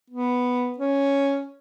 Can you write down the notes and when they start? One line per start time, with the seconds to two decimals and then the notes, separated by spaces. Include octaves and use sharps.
0.10 B3
0.78 C#4